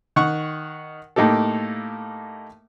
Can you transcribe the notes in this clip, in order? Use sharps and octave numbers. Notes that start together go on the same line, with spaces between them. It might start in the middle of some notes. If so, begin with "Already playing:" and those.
D#3 F#5 C#6
A2 A#3 D#4 G4 A4